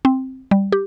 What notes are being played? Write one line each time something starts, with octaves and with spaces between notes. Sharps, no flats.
C4
G3
G4